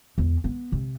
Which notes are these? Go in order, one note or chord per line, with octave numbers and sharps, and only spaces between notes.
E2
B3
C3